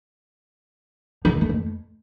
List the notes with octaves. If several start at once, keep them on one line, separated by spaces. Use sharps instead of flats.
F3
D#3
A3
F2